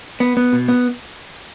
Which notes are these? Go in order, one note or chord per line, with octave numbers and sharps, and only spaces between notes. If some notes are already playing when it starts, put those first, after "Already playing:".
B3
B3
B2
B3